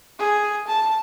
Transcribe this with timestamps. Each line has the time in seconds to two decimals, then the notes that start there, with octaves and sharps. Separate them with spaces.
0.19 G#4
0.68 A5